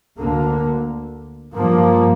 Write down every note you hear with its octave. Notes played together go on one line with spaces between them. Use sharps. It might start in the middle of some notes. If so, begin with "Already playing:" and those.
D2 D3 A#3
G2 F3 A#3